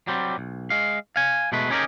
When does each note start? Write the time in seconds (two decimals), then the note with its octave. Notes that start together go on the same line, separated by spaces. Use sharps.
0.07 F#3 G3 C4
0.38 B1
0.70 G#3 F5
1.16 F5 G#5
1.52 B2 G#3 A3 B4
1.70 C#4 D#4 G4 G#4 A#4